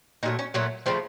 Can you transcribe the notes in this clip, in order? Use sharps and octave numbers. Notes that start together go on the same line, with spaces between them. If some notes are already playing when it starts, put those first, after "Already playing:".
A#2 F#3 A3 D#4
C#4
A#2 F#3 A3 C#4
C#3 F3 A3 C4